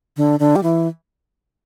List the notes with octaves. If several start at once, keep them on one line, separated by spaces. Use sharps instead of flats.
D3
D3
G3
E3